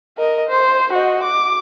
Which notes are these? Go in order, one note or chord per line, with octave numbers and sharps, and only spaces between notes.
A#4 D#5
C5
F#4 D#5
D6